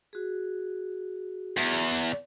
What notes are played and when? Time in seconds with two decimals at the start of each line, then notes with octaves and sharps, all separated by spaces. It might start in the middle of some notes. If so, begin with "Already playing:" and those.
0.13 F#4 G#4
1.57 E2